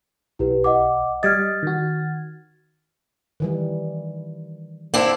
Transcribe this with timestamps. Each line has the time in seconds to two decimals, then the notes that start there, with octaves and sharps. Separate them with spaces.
0.39 B1 E4 G4 B4
0.64 D#5 F#5 D6
1.23 G3 D#5 F6 G#6 A6
1.63 D#3 F#4
3.40 D#3 E3 G3
4.94 A#3 C4 D4 E4